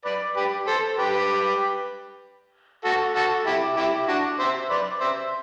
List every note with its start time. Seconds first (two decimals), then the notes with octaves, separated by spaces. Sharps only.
0.05 B4 D5
0.36 G4 B4
0.67 A4 C5
0.98 G4 B4
2.85 F#4 A4
3.16 F#4 A4
3.47 E4 G4
3.77 E4 G4
4.08 D4 F#4
4.40 C5 E5
4.70 B4 D5
5.01 C5 E5